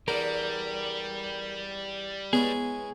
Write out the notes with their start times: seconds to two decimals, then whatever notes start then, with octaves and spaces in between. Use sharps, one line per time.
0.08 E2 G3 D4 A#4
2.33 G#3 B3 C#4 E4 G#4